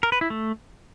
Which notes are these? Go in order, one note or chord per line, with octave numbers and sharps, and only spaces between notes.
A#4
B4
E4
A3